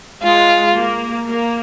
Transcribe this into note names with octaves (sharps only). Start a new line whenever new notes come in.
G#3 F4
A#3
A#3